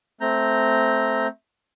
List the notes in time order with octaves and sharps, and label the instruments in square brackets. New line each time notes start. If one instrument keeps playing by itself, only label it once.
[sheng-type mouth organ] A3 C4 A#5 G6